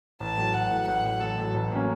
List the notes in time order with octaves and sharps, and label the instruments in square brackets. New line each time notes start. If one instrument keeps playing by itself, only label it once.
[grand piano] A1 [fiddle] A5
[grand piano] A2 F#3
[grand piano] A1 [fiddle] F#5
[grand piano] A2 F#3
[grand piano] A1 [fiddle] F#5
[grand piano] A2 F#3
[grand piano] A1 [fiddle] A4
[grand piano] A2 F#3
A1
A2 F#3 A#3 C#4